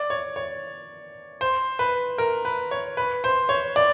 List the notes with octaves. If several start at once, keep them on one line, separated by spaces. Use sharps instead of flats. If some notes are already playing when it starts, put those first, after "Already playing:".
Already playing: D5
C#5
C#5
C5
B4
A#4
B4
C#5
B4
C5
C#5
D5